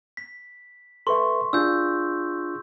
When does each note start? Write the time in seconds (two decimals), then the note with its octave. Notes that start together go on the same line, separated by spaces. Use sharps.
0.17 B6
1.07 A4 B4 E5 C6 C#6
1.53 D4 F4 G#4 E6 G6